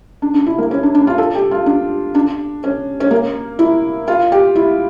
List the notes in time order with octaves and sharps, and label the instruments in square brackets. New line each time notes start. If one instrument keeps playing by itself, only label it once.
[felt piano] D4
D4
E4
A#3
C#4
D4
D4
F4
A4
G4
F4
D4
D4
C#4
C#4
A#3
E4
F4
G4
E4